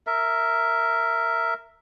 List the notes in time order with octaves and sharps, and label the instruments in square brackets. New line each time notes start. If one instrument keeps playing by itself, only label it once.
[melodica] A#4 E5